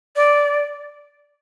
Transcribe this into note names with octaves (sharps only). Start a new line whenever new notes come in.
D5